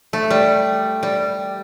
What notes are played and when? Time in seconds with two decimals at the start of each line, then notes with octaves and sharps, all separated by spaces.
0.13 A3
0.31 G3
1.03 G3